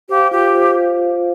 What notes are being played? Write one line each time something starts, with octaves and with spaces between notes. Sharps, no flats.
G4 C5 F5
F4 G4
C5 F5